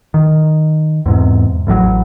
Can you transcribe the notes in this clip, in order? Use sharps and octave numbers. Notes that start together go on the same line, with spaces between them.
D#3
E2 G#2 C3
A1 A2 D3 F#3